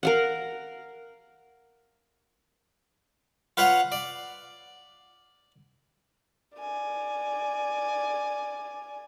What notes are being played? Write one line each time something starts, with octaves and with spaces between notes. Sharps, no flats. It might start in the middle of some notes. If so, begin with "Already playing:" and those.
A#4 F5 F#5
F4 B4 C#5 F5 F#5
D5
D5 G#5